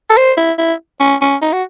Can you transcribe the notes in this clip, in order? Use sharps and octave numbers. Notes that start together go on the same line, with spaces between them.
A4
C5
E4
E4
C#4
C#4
D#4
F#4